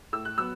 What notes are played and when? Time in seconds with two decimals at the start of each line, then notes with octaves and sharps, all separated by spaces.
0.13 A2 E6
0.25 F#6
0.38 F#3 B3 E6